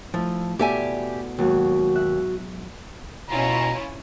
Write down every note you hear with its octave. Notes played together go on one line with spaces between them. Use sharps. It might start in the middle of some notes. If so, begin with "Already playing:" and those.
F3 A3 E4
B2 G4 A4 D5 E5 G#5
D#2 G#2 F#3 F#4
E5 F#6
B2 C#4 E4 F4 A#5